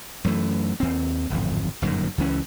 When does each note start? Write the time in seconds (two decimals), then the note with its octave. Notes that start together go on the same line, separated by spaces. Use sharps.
0.24 F#2 E3 A3
0.80 D#2 C4
1.30 D1 G#1 F2
1.82 G1 F#2 A#2 D#3
2.18 C#2 E3 C#4